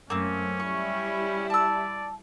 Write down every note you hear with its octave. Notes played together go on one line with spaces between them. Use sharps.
F#2 A3 A#3 C4 C#4
G3 E4 C#6
D5 A5 E6